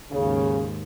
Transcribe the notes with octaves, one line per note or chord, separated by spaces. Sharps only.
D#2 G#2 C#3